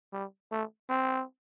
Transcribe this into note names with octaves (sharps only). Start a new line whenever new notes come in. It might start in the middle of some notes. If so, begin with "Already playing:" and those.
G3
A3
C4